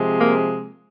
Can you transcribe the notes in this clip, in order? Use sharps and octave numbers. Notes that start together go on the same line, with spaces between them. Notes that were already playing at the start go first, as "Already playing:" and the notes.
Already playing: C3 F3 G#3
A#3